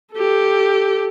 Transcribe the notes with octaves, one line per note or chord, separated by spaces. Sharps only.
G4 A4